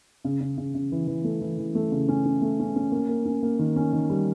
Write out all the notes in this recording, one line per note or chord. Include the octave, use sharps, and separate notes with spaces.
C#3
C#3
C#3
C#3
E3
E3
A3
E3
E3
A3
C#3
C#4
C#4
A3
C#4
C#4
A#3
A#3
C#4
A#3
D#3
C#4
D#3
G3